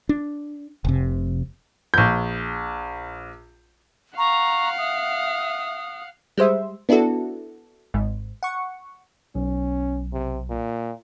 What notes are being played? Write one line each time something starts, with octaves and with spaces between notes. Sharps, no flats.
D4
F1 C3
A#1 G6
F5 F#5 A#5 C#6
E5 D#6
G3 G#3 C5 E5
B3 D4 E4 F#4 A4
G#1 G#2
F#5 C#6
B1 C#4
C3
A#2